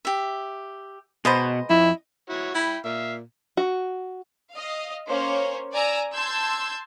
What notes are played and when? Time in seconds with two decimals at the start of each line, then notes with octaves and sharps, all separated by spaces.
0.05 G4 E5
1.25 B2 G#3 B3 C5 D#5 A#5
1.70 F2 E4
2.30 E4 F#4 C#5
2.55 E4 G5 B5
2.85 A#2 E5 F5
3.57 F#4
4.54 D#5 F5
5.07 A#3 C#4 C5 C#5
5.72 D5 G#5 A#5 E6
6.12 A5 C6 E6 G6 G#6